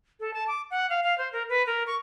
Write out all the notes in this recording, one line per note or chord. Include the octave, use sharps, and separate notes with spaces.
A4
A5
D6
F#5
F5
F5
C5
A#4
B4
A#4
C#6